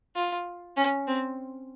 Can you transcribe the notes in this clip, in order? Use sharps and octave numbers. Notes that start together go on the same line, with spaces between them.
F4
C#4
C4